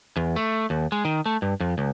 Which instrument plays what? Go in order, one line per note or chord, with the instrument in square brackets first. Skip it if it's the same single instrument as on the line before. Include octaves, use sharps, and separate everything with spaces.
[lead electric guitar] E2
A3
D#2
G#3
D#3
A3
G2
F2
C#2